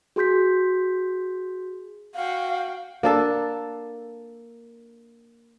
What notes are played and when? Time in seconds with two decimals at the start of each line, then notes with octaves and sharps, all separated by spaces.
0.16 F#4 G#4 C6 G6 B6
2.15 F#4 F5 G5
3.03 A#3 D4 A4